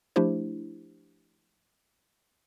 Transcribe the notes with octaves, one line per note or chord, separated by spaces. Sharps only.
F3 A3 D4 E4 G4 C5